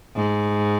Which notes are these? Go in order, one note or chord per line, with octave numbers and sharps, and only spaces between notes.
G#2